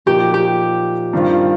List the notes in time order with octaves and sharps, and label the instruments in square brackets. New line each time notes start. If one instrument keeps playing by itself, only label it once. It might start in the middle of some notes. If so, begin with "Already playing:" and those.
[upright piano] A#2 F3 D#4 A#4 [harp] G4
[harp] G4
[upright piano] G2 D#3 C4 F4